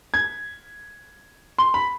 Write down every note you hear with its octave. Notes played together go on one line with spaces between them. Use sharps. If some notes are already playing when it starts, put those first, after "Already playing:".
G#6
C6
B5